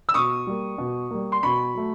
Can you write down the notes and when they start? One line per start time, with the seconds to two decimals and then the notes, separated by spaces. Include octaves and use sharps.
0.09 E6
0.14 B2 C#6 D#6
0.47 G3 A#3
0.78 B2
1.10 G3 A#3
1.32 C6
1.43 B2 B5 C#6
1.75 F#3 A3